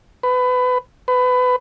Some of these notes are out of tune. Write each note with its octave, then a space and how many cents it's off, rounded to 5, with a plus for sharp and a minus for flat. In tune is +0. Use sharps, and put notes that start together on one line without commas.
B4 +25
B4 +25